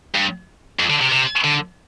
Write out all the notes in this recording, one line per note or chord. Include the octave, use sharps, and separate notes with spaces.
G2
F2
D3
C3
C3
D3